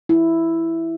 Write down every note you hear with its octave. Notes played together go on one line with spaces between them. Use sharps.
E4